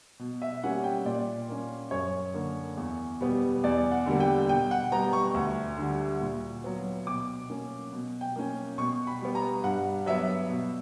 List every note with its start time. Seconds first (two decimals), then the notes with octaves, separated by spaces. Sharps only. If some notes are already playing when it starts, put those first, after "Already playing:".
0.19 B2
0.42 E5
0.63 G3 A#3 C#4 F#5
0.84 G5
1.05 A#2 D5
1.49 A#3 C#4
1.91 F#2 C#5
2.34 D3 A#3
2.77 E2
3.21 B2 G3 B3
3.63 E2 D5
3.92 F#5
4.06 D3 G3 A#3
4.20 G5
4.49 B2 G5
4.71 F#5
4.92 G3 B3 A#5
5.13 C#6
5.34 D2
5.77 D3 G3
6.21 A#2
6.64 F#3 B3
7.07 B2 D6
7.50 A#3 C#4
7.93 B2
8.21 G5
8.36 A#3 C#4
8.78 B2 C#6
9.07 B5
9.21 G3 B3
9.35 A#5
9.64 G2 F#5
10.06 F#3 B3 E5
10.50 B2